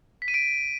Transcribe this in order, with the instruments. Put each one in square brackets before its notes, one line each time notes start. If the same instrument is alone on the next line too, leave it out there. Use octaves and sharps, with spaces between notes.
[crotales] B6
D#7
D7